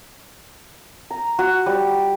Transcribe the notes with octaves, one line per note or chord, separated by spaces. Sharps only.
A#5
F#4
G3